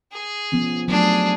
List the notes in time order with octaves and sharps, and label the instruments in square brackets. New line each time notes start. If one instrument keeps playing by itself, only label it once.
[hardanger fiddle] G#4
[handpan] F3 B3 C#4
[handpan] F#3 A3 [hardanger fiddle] D4 G#4